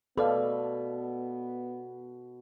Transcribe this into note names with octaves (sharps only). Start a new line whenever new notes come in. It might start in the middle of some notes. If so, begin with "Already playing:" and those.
B2 B3 A4 B4 D5 F5